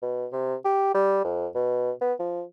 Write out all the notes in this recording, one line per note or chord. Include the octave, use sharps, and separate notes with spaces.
B2
C3
G4
G3
F2
B2
B3
F3